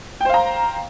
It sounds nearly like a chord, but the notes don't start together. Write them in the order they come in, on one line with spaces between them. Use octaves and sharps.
G5 C5 F5 A#5